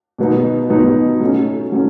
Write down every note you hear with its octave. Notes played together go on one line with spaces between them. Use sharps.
B2 F#3 B3 D#4
B2 F#3 B3 D#4
F#3 A3 C#4
F#3 A3 C#4